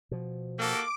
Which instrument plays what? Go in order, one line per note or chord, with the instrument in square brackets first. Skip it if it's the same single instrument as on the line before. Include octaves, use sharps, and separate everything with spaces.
[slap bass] B2 F3
[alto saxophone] A#3 [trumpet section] F#4 G4 A4 [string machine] D6